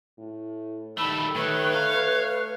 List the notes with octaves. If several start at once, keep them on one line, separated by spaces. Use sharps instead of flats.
A2
D#3 G3 A3 B5 E6
D#3 A3 B4 C#5
F5